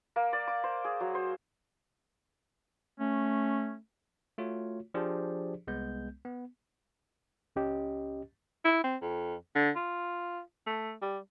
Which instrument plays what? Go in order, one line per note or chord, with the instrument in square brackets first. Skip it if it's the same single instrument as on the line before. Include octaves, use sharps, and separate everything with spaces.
[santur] A#3
D5
D6
C5
G#4
F#3
C5
[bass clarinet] A3 [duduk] C#4
[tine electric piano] A3 F4 F#4 C#5
F3 D4 G4 G#4 C5 D5
C2 G#3 B3 G6
B3
[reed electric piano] C#2 C#4 G4 D#5
[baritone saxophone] E4
C4
F2
D3
F4
A3
G3